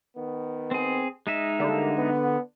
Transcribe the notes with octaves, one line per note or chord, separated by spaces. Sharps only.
D#3 B3
C4 G#4
G#3 D#4 E5
D3 G3 A#3
B3